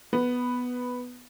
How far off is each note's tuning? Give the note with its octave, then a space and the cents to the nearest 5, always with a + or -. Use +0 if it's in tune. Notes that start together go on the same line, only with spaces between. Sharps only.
B3 +0